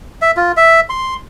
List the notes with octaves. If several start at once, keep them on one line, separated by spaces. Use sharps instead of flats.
E5
F4
E5
C6